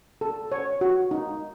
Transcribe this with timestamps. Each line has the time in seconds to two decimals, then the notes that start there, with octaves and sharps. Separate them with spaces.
0.21 A4
0.52 C#5
0.81 F#4
1.11 D#4